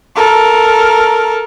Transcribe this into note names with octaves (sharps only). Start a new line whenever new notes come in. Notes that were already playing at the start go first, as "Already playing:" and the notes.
A4 A#4